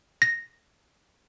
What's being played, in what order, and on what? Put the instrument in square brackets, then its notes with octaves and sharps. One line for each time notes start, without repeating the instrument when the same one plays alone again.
[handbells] A#6